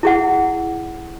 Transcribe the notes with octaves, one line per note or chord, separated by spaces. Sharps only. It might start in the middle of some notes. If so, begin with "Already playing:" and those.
E4 G#4 F#5